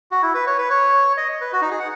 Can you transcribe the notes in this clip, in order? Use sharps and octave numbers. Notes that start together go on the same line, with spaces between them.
F#4
E4
B4
C#5
B4
C#5
D#5
B4
F#4
D#4
G#4
F#5